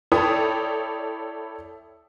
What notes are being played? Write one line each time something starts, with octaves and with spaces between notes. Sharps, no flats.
E4 A4 C#5 D5 G5 D#6